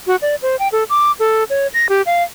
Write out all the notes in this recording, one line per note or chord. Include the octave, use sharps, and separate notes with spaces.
F#4
D5
C5
G5
A4
D6
A4
C#5
A#6
G4
F5